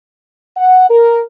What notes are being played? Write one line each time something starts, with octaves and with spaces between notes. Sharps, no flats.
F#5
A#4